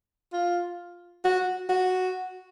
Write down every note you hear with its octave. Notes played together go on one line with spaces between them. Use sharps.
F4
F#4
F#4